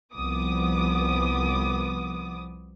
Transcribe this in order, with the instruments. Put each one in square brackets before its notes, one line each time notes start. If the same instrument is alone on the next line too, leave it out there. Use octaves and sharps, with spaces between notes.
[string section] C2 F3 B3 D6 D#6